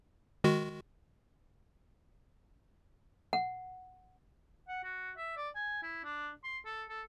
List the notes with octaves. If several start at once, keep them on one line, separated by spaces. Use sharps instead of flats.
D#3 G#3 F#4
F#5
F#5
F#4
E5
D5
G#5
E4
D4
C6
A4
A4